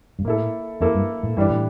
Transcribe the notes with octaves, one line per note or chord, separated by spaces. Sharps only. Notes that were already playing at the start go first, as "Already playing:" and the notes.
G2
A2 A#3 E4 A4
F2 A#3 E4 A4
G2
A2
G2 E3 G3 D4
A2